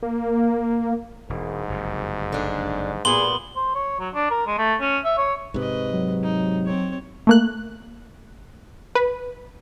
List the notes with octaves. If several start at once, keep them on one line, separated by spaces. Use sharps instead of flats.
A#3
E1 G#2
F#1 F2 C3
D3 D4
A#2 G3 B3 G#4 C6 F#7 G7
C5
C#5
F#3
D4
A#4
G#3
A3
C#4
E5
C#5
G#2 C3 B4 D#5
F#3
D#4
C4 C#5
A3 A#3 F#6
B4